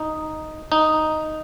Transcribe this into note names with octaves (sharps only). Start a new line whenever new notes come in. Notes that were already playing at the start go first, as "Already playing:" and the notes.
Already playing: D#4
D#4